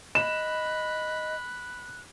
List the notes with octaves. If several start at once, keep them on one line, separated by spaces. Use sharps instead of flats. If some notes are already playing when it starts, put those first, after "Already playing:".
D#5 B5 F#6 E7